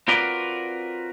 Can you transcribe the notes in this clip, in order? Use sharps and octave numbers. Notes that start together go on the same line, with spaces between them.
C4 F4 F#4 A#4 B4 D5